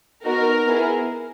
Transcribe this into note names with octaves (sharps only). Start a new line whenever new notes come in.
B3 D#4 F#4 A#4
B3 E4 G#4